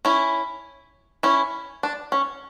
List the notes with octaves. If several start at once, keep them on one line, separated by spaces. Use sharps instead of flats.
C#4 E4
C#4 E4
D4
C#4